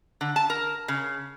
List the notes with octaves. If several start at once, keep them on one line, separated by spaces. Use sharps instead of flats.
D3
A5
A#4
C#3